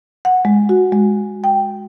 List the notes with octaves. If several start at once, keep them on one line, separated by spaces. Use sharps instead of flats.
F#5
G#3
F#4
G#3
G5